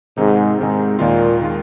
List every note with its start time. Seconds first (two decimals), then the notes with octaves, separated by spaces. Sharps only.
0.17 G#2 C3 D#3 C4 D#4
0.58 G#2 C3 D#3 C4 D#4
0.99 D#2 A#2 D#3 G#3 F4
1.42 D#3 G#3 F4